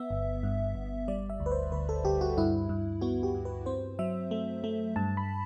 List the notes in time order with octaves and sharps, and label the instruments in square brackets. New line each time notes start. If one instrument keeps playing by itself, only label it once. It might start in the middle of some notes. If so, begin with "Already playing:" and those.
Already playing: [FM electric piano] B3 E5
G1
G2
G1
G3 D5
E5
D2
B4
C5
D2 B4
A4
D2 G4
F#4
G2 E4
G2
B3 F#4
G4
G2
B4
C4 C5
F#3 E5
A3
A3
G2 A5
B5